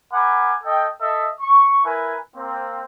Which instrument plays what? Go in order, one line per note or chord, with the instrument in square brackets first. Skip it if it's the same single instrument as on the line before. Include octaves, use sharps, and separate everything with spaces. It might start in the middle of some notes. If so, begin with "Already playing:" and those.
[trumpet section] A#4 F#5 G#5 B5 D6
A4 D#5 G5
A4 D#5 E5
C#6
E4 A#4 B4 G#5
A#3 C4